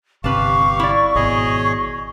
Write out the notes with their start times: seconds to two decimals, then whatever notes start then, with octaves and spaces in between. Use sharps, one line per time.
0.24 G1 C3 C4 G4 B4 F5 A5 C#6
0.80 E4 D5
1.16 G#1 B2 G#4 C#5 D#5